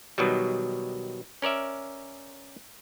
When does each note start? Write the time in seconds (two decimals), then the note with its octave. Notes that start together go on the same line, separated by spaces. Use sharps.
0.18 B2 D#3 F#3 G3
1.42 C#4 A#4 D5 E5